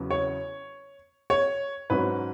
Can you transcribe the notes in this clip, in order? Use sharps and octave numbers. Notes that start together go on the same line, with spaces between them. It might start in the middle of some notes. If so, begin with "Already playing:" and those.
Already playing: E2 C#3 F#3 B3
C#5
C#5
G#2 F#3 C#4 B4